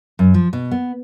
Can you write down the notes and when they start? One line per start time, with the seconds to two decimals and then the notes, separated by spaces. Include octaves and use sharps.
0.19 F#2
0.34 F3
0.53 B2
0.71 B3